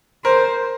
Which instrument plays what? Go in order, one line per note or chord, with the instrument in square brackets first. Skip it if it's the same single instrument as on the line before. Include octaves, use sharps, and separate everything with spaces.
[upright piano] A#4 [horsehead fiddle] C5